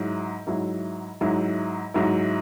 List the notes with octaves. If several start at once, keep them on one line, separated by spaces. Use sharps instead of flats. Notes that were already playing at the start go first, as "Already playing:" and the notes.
Already playing: G#2 F#3 E4
G#2 F#3 E4
G#2 F#3 E4
G#2 F#3 E4